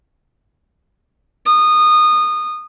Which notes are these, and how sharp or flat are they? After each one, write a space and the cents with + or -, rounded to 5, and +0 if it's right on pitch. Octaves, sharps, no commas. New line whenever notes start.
D#6 -20